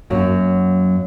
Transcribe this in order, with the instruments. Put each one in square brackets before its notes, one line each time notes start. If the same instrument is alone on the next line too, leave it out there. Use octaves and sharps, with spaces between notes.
[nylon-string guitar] F#2 F#3 A#3